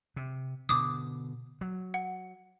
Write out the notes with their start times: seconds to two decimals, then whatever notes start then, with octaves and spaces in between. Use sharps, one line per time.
0.16 C3
0.69 B2 D3 D6 D#6
1.61 F#3
1.94 F#5